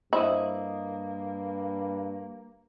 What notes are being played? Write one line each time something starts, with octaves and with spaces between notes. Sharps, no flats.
G2 A#3 E4 C5 D#5 D#6